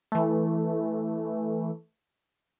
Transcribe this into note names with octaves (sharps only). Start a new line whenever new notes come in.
E3 A3